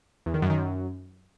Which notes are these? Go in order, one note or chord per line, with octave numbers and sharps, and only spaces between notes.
E2
D#3
F#2
D#3
F#2